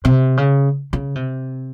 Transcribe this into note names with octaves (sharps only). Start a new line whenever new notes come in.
C3
C#3
C#3
C3